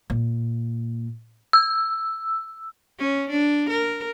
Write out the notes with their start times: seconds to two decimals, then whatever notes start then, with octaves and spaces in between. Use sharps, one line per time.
0.10 A#2
1.53 E6
2.99 C#4
3.30 D4
3.69 A#4